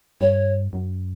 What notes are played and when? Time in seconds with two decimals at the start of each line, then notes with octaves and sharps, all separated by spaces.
0.21 G2 C#5
0.73 F#2